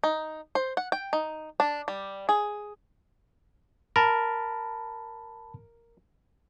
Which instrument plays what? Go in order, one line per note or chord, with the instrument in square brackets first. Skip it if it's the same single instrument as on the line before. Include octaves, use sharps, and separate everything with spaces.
[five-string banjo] D#4
C5
F#5
G5
D#4
D4
G3
G#4
[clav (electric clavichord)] A#4 [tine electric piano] A5 B5